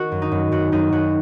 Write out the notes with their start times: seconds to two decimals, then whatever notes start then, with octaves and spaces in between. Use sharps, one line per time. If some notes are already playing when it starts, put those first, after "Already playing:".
Already playing: D#3 F#4
0.12 F#2
0.22 D#4
0.32 F#2
0.52 F#2 F#4
0.72 F#2 D#4
0.92 F#2 F#4